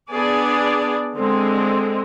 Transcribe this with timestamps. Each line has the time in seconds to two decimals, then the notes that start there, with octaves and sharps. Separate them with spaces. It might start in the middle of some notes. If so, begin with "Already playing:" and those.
0.10 B3 D4 G#4 D5
1.15 D3 G#3 C4